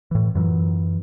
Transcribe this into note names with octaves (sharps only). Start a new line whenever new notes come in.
A2 E3
F#2 E3 F#3